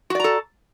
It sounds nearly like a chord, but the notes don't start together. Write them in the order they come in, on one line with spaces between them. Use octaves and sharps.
F#4 D5 A#5 A4